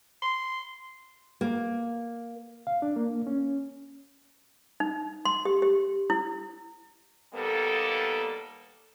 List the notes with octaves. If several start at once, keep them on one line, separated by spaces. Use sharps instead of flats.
C6
A#3
F5
D4
A#3
C#4
D#4
C6
G4
G4
E4
D#2 G3 A#3 B3 A4